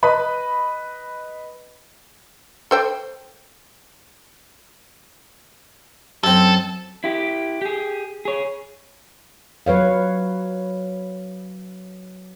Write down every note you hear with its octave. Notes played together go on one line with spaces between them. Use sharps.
B4 D#5 B5
A4 C5 G5
F#2 C4 A4
E4 G4
G4 G#4
G#4 C#5
F#3 B4 C#5 F5